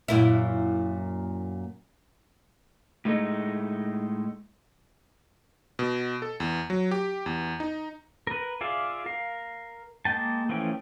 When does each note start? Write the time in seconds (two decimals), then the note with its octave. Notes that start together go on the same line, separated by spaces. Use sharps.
0.08 F#2 A#2 E4
3.05 A2 G#3 A3 D#4
5.79 B2
6.22 A4
6.40 E2
6.70 F#3
6.91 G4
7.26 E2
7.60 D#4
8.27 A#4 B4
8.61 F4 G#4 D5 E5 F5
9.06 A#4 F5
10.05 G#3 A#3 G5 A5
10.49 E3 F3 A3 C#4 G5